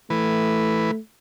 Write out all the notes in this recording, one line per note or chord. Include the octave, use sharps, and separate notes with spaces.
E3 A3 B4